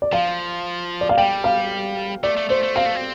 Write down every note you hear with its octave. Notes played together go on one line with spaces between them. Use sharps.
D5
F3 F5
D5
F5
G3 G5
F5
A3 D5
A3
A3 C5
A3
C4 F5
A3
C4